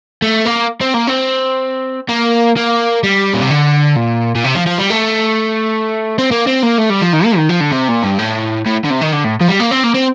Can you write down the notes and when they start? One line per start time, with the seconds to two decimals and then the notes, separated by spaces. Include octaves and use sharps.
0.22 A3
0.45 A#3
0.81 C4
0.94 A#3
1.07 C4
2.09 A#3
2.56 A#3
3.03 G3
3.34 A#2
3.42 C3
3.51 D3
3.96 A#2
4.35 A#2
4.44 C3
4.55 F3
4.67 F3
4.79 G3
4.91 A3
6.18 C4
6.31 A#3
6.47 C4
6.63 A#3
6.78 A3
6.90 G3
7.02 F3
7.14 D#3
7.25 A#3
7.37 D#3
7.49 F3
7.60 D3
7.72 C3
7.88 A#2
8.03 G2
8.18 A2
8.66 A2
8.84 D3
8.90 C3
9.01 D#3
9.12 D3
9.24 A2
9.41 F3
9.49 G3
9.60 A#3
9.71 C4
9.84 A#3
9.95 C4